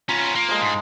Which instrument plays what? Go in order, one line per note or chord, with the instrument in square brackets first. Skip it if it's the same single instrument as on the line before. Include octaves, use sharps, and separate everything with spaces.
[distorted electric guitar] B3 C#4 [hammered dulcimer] F4 A#5
[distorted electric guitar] A#3
[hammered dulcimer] F3 G#3
[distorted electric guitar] G#2